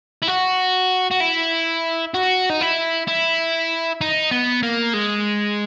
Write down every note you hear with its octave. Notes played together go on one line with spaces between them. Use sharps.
E4
F#4
F#4
E4
F#4
D#4
E4
E4
D#4
B3
A#3
G#3